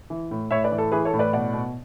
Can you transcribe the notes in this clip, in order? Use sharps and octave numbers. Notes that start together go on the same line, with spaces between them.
E3
A2
A2 C#5 E5
B4 D5
E3
A4
E3 G#4 B4
A4 C#5
A2
B4 D5
B2 D5 F#5
B2